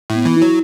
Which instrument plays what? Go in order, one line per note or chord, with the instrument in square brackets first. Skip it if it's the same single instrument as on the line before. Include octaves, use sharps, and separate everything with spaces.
[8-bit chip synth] A2 [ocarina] B3
[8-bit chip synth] E3
[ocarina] E4
[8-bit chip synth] F#3